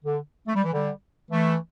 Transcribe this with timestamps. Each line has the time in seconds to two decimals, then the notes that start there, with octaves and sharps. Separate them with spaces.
0.04 D3
0.47 A3
0.55 G3
0.63 E3
0.72 D3 G3
1.30 E3 A3